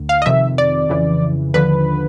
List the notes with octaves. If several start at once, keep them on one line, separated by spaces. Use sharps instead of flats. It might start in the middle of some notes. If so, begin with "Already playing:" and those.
Already playing: D2
F5
D#5
F2 C3 D#3 E5
D5
F2 C#3 E3
D#2 D3 F3 B4